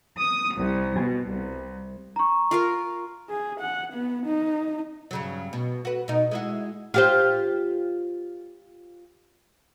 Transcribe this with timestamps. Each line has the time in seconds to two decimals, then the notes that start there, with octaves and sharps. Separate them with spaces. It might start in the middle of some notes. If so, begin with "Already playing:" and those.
0.19 D#6
0.57 C2
0.98 B2
1.28 C2
2.16 A#5 C#6
2.51 F4 A#4 F5
3.30 G#4
3.60 F#5
3.93 B3
4.26 D#4
5.11 G2 C#3 F#3
5.53 B2
5.85 F#4 B4
6.08 B2 D#4
6.31 G#3 E4 F#4
6.94 F4 G4 C5